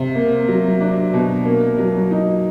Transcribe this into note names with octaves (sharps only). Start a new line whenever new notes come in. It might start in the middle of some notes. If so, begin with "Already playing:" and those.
Already playing: C3
A#3
F#3
D4
B2
A#3
F#3
D#4